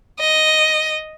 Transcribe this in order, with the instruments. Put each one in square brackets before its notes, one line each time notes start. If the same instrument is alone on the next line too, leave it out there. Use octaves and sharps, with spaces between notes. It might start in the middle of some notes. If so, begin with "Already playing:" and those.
[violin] D#5